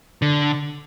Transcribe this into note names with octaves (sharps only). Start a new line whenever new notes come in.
D3